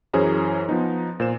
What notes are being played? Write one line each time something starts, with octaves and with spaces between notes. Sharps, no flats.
F#2 E3 C#4 G#4 C5 A#5
F3 B3 D#4
A#2 C5 E7